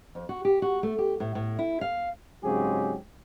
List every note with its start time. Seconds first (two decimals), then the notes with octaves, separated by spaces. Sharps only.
0.15 F2
0.29 F#4
0.45 G4
0.62 F#4
0.83 A3
0.98 G4
1.20 A2
1.35 A2
1.59 E4
1.81 F5
2.44 G#2 C#3 F#3 C4 G4 G#4